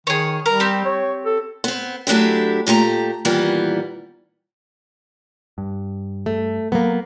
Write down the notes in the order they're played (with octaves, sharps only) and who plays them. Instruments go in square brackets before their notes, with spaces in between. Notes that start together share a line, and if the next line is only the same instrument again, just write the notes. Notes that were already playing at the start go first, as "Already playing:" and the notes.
[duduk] D#3 [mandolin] G#4 C#5
[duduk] G3 [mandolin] A#4
[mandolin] C4 G4
[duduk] C#5
A4
[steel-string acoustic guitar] B3 C4
F#3 A3 D4 E4 G4
A#2 A3 G4 A#5
A#2 D#3 E3 G3 B3
[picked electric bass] G2
[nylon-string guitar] A3
[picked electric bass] F#3 [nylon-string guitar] A#3 B3